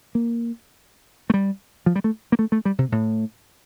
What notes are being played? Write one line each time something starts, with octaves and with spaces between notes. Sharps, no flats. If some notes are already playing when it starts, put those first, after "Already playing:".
A#3
A3
G3
F3
G3
A3
A#3
A3
A3
G3
C3
A2